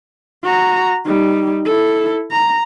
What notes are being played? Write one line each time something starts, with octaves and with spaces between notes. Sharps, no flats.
F#4 A#5
G3 D#4
E4 A4
A#5